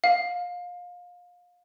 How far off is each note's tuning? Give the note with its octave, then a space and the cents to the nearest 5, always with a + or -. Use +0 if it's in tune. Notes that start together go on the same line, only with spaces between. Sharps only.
F5 +25